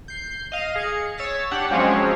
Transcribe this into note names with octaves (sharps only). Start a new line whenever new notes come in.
G6 C7
D#5 F5 D#7
G#4 C#7
C#5 E6 A6 B6
D4 G4 F#5
F3 F#3 G#3 C4 C#4 C#5